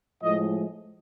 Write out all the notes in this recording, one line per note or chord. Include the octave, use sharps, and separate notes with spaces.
A2 F3 G#3 D#5